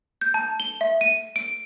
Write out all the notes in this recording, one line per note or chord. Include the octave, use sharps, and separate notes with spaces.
G6
A5
G7
E5
D#7
D7